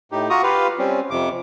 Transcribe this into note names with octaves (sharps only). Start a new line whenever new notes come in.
A2 D#4 G4
F4 F#4 A#5 C#6 D#6
F4 G4 B4 F5
G3 C4 C#4
F2 C3 D6